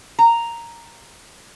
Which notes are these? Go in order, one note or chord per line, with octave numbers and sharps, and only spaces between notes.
A#5